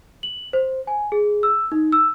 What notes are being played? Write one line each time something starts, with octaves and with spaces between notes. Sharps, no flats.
F#7
C5
G#5
G#4
E6
D#4
E6